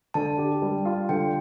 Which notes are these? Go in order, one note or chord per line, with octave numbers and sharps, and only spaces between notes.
D3 A5
G4
G3
F4
D3 G5